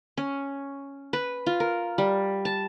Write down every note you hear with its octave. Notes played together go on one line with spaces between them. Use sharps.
C#4
B4
F4
A#4
G3
A5